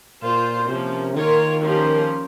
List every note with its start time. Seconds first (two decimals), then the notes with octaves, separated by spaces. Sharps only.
0.22 A#2 A#3 F4 C5
0.69 C3 F3 A#3 C#4
1.15 D#3 A#3 F4 A#4 C#5
1.62 F3 A#3 C#4 G4 A#4